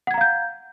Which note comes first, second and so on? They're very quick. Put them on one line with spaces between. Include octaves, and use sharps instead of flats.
F#5 G#6 A#5 F5 G6